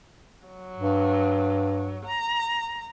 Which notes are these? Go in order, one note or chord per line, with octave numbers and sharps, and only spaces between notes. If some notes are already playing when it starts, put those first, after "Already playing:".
F#3
G2
A#5